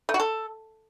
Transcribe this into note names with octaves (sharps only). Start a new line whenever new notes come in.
A3
F#4
A4